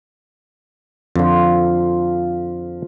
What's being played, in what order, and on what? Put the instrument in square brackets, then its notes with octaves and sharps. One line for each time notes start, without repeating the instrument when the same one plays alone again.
[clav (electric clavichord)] F2 D3 [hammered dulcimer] F3 F4